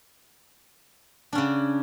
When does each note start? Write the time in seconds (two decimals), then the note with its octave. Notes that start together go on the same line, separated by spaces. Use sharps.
1.33 D4
1.35 C#4
1.38 C#3